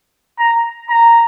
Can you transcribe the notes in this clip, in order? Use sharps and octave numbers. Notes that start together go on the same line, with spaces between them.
A#5
A#5